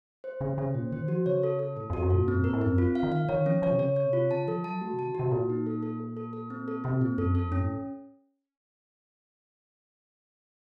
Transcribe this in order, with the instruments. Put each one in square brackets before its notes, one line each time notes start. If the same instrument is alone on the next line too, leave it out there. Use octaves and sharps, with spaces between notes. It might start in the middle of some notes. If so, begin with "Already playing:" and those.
[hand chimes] C5
[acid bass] C#3 [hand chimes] C#4
[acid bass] C#3 [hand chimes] C#4
[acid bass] A#2 [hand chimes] C5
[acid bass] D#3 [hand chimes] C5
[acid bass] F3 [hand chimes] F#4
[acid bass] C#3 [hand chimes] C#5
[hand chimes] A4
A4
[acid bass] A2 [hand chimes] A4
[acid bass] F2 [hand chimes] F#4
[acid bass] F#2
[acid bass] A#2 [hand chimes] A4
[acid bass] F#2 [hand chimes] C4
[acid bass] A#2 [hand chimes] A#4
[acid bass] A2
[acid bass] F#2 [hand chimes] C4
[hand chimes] F4
F5
[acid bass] D#3
[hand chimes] F5
[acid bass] D#3 [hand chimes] C#5
[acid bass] F3 [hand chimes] C#4
[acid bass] F3 [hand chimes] C#5
[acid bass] C3
[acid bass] C#3 [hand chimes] C#5
[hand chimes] C#5
[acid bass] C3
[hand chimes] F4
[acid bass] C#3 [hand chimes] A5
[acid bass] F3 [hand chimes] A4
[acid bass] F#3 [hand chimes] A5
[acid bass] A3 [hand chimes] F#4
[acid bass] C3
[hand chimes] A5
[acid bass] D#3
[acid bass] C3 [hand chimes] F#4
[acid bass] A#2 [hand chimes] A4
[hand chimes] D#4
A4
A4
A4
A4
A4
C4
A4
[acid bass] C3 [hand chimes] C4
[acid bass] A#2 [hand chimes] C4
[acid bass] F#2 [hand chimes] A4
[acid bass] F2 [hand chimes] A4
[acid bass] F#2 [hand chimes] C#4
[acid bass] A2